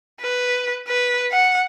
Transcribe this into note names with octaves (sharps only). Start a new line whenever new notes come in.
B4
B4
F#5